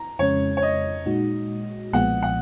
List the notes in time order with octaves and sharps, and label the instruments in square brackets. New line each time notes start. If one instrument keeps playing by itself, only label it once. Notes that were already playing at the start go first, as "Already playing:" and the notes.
Already playing: [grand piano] A#5
[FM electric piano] F2 C#3 G#3 C#4 [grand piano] C#5
[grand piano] C#5
D#5
[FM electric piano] A#2 G#3 D#4 F#4
[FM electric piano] B1 A#2 F3 G#3 B3 [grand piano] F#5
[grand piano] F#5